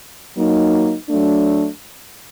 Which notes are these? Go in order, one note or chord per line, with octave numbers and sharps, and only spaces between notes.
F#3 A#3 D#4
F#3 A3 D4